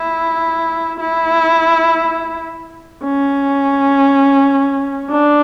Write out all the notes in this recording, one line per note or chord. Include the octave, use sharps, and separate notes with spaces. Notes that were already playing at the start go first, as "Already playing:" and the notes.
Already playing: E4
E4
C#4
D4